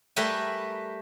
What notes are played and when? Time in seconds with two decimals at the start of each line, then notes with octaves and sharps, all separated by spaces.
0.16 G3 A3 A#4 B4 G5 G#5